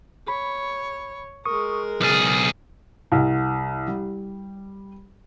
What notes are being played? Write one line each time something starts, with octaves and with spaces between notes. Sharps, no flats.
C#5 B5
G#3 A#4 C#6 D#6
B1 C#3 G#4 F6 A6
C2
G3